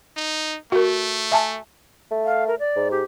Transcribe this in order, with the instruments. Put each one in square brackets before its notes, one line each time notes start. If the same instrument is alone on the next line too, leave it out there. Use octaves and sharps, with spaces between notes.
[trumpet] D#4
[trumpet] A3 [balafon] F#4 A#4
[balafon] E5 G#5 A5
[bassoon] A3
[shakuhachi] F5
A#4
D5
[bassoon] G#2
[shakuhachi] G4